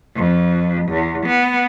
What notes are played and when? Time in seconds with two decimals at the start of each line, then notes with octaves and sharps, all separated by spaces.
0.14 F2
0.88 E2
1.25 B3